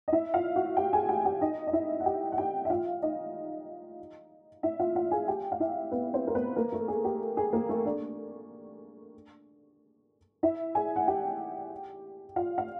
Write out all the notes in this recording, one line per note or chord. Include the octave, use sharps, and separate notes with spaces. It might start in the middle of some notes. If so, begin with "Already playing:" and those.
D#5
E4 E5
F4 F5
F#4 F#5
G4 G5
G#4 G#5
G4 G5
G4 G5
D#4 D#5
D#5
E4 E5
F#5
G4 G5
F#5
G4 G5
E5
F4 F5
D#4 D#5
E4 E5
F4 F5
F4 F5
G#4 G#5
G4 G5
F5
E4 E5
B3 B4
C4 C5
A#4
B3 B4
A#3 A#4
A3 A4
G#4
G4
G#4
A#3 A#4
A3 A4
D4 D5
E4 E5
G#4 G#5
F#5
G4 G5
F4 F5
F5